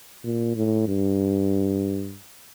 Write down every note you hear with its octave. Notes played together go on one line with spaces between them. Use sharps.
A#2
A2
G2